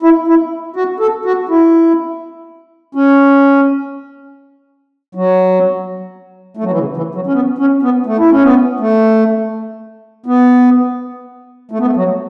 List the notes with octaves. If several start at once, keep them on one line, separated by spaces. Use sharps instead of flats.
E4
E4
F#4
A4
F#4
E4
C#4
F#3
A3
F#3
E3
C#3
E3
F#3
C#4
B3
C#4
B3
A3
E4
C#4
B3
A3
B3
A3
B3
A3
F#3